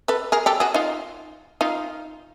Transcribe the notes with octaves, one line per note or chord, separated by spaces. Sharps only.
A4 B4
G#4 A#4
G4 A4
F#4 G#4
D#4 F4
D#4 F4